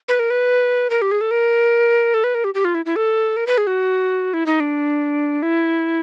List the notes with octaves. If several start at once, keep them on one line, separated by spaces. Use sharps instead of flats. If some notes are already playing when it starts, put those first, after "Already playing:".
B4
A#4
B4
A#4
G4
G#4
A4
A#4
A4
B4
A#4
G4
G4
F4
E4
E4
A4
A#4
B4
G#4
F#4
E4
D#4
D4
E4